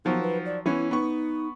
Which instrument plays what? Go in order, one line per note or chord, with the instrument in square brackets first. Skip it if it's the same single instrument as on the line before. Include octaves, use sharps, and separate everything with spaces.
[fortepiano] D#3 F3 F#3 [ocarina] B3
[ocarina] B4
D5
[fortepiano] E3 B3 C#4 [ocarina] E4
[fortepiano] B3 C#6 [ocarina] D#4